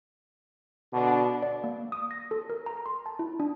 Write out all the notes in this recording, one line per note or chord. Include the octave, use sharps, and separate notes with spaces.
B2 D3 D4
D5
A#3
D#6
A#6
A4
A#4
A#5
C6
A5
E4
D4